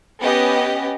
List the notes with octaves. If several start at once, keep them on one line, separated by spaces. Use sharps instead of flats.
B3 C#4 G4 D#5